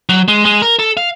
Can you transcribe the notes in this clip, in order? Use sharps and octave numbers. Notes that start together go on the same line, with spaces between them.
F#3
G#3
G#3
A#4
A4
F5